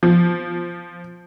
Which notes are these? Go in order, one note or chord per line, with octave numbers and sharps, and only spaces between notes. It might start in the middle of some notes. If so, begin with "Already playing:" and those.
F3